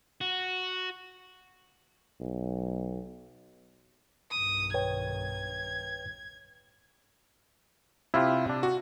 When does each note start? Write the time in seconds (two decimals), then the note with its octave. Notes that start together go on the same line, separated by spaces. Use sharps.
0.21 F#4
2.21 B1
4.31 B1 G2 D#3 D#6
4.74 B4 C#5 G5 G#6
8.14 C3 E4 F4 G4
8.49 D4
8.63 F#4